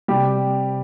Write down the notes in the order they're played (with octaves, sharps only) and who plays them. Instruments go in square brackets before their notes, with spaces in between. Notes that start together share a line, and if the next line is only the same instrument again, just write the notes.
[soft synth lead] C3 [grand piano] G3 G4